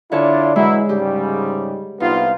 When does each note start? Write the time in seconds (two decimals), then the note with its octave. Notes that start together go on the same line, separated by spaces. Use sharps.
0.12 D3 D4 E4 F4 C#5 A5
0.56 E3 F#3 G#3 E4
0.89 G#2 C#3 G3 G4
2.00 C2 B3 D#4 F4